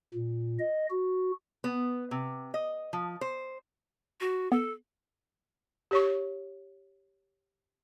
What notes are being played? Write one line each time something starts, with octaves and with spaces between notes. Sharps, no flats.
A#2
D#5
F#4
B3
C3
D#5
F3
C5
F#4
B3 A4
G4 C#5 C#6